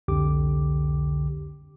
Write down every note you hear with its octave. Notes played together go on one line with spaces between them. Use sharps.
C2 F2 D3 G4 D6